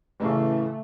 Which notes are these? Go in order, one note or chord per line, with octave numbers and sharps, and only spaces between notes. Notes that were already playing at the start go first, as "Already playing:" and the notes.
A1 A2 C#3 E3 A3